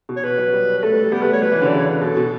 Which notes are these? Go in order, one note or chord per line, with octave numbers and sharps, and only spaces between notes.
B2
C#5
B2 B4
F#3
G3
B4
A3 A4
G3
G3
B3 G4
A3 B4
G3 C#5
F#3 B4
E3
D3
C#3 D5
C#5
B4
B2 A4
B2